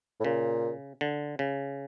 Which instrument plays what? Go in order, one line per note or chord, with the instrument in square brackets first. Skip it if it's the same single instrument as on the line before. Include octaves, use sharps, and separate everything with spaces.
[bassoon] A2
[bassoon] A#2 [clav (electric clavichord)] C#3
[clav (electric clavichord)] D3
C#3